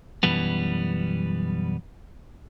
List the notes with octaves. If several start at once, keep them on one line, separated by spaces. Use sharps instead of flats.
B1 F#2 E3 G3 B3